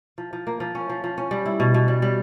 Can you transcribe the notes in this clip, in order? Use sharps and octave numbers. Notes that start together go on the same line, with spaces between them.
F3
F3
A#3
F3
C#4
F3
F3
C#4
G3
E4
B2
B2
G3
G3